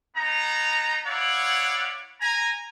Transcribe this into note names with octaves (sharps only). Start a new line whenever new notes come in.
B3 D#4 A#5
E4 C#5 D5 F5 F#5
G#5 A#5